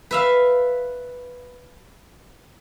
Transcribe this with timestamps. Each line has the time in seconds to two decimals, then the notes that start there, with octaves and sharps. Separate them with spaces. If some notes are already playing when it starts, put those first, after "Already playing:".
0.11 B4 E5 F5